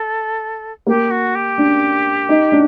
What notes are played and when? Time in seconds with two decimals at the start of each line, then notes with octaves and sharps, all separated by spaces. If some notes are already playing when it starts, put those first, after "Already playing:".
Already playing: A4
0.87 A#3 G4
1.10 F#4
1.35 G4
1.58 D4
2.29 D#4
2.52 D4